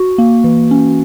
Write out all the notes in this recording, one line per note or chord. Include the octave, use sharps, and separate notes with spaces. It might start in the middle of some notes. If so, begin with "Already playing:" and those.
Already playing: F#4
A#3
E3
C#4